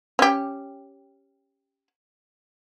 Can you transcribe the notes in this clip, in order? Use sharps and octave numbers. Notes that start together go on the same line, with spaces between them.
C#4 G4